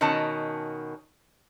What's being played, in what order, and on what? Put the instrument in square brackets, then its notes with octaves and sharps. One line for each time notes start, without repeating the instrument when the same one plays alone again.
[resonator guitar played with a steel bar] B2 D#3 C#4 A5